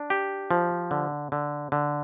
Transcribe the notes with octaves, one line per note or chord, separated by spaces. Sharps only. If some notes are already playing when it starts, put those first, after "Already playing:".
Already playing: D4
G4
F3
D3
D3
D3